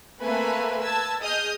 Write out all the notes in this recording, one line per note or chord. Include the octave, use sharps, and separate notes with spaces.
A3 A#3 C4 B4 E5 G#5
B4 A5 E6 G#6
G#4 D#5 D#6 F6 G6